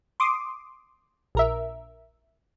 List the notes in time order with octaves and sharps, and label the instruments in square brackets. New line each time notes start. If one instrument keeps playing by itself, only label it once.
[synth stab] C6 D6 D#6
A#1 A#4 E5